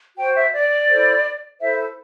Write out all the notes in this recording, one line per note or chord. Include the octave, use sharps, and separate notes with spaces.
F#4 C5 G5
E5
D5
E4 A4 C5
E4 A4 C5 E5